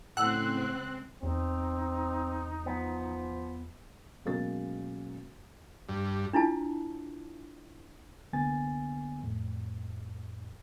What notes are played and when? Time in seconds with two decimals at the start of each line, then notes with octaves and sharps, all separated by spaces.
0.17 A2 C#3 G#3 C4 F#5 E6 F#6
1.23 E2 C4 D#4
2.66 F3 B3
4.25 B1 G#3 A#3 C#4 A#4 A6
5.89 G2
6.33 D4 E4 F4 A5
8.33 C2 D3 A#3 B3 G#5 A6
9.23 F2 A2